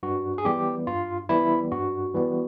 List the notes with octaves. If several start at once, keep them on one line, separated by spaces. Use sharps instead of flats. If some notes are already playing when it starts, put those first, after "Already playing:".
G2 F#4
G#4
E3 G3 B3 G4
G2 F4
E3 G3 B3 E4
G2 F#4
E3 G3 B3